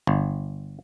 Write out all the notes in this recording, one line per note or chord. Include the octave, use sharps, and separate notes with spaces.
G1